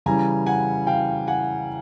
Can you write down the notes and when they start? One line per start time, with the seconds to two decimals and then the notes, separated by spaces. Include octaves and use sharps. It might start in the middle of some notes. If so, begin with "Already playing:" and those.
0.06 C#3 E3 G3 G#5 A#5
0.46 F#5 G#5
0.87 F5 G5
1.27 F#5 G#5